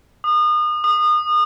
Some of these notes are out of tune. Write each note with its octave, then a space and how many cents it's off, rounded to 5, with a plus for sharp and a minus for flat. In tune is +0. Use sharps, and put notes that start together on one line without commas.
D#6 -35
D#6 -30